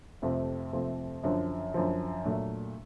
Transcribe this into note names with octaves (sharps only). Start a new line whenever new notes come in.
F2 C3 F3 A3 C4
F2 C3 F3 A3 C4
F#2 D3 F3
F#2 D3 F3
A#2 F#3 A3 D4